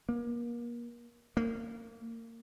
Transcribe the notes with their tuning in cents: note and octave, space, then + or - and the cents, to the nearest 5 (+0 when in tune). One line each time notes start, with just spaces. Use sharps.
A#3 +35
A#3 -30